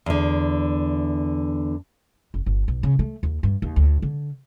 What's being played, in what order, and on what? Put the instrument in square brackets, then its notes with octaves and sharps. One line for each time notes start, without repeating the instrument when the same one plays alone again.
[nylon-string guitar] E2 D3
[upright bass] F#1
G1
B1
C#3
A3
D#2
G2
D#2
D2
D3